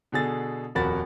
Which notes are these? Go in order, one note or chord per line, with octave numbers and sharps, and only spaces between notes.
B2 D3 G#4 A6
D#1 F2 F#4 A#4 B5 A6